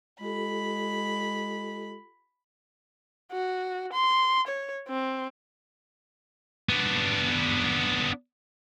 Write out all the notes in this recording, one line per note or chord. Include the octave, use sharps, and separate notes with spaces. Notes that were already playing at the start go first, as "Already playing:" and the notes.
G#3 F4 G4 A4 B5
F#4
C6
C#5
C4
B3 D4